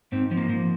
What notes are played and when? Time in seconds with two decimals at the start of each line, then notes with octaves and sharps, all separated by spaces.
0.12 G#2 C4
0.31 F3
0.37 A#3
0.49 F3